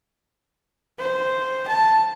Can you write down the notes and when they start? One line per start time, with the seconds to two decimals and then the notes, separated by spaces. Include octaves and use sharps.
0.99 C5
1.68 A5